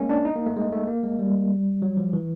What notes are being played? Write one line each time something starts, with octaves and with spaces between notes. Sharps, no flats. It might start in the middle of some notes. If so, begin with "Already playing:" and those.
Already playing: G#3 A#3 C#4
D4
D#4
A#3
A3
G#3
A3
A#3
G#3
G3
F#3
F3
E3